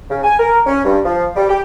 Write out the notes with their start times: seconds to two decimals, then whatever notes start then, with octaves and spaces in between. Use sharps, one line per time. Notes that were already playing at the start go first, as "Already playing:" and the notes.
0.10 C#3
0.23 G#5
0.39 A#4
0.67 C#4
0.85 G2
1.05 F3
1.36 G3
1.49 G4